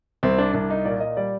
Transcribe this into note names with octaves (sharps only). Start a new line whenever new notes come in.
C2 C4
D4
C2 D4
D#4
A#2 D5
D#5
G3 D5